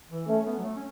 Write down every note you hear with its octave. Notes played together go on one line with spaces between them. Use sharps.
E3
A3 C#4
B3
F#3
A3
C#4